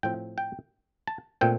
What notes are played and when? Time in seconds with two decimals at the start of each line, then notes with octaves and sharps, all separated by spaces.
0.03 A2 F3 C4 G5
0.38 G5
1.07 A5
1.41 A#2 A3 C4 G5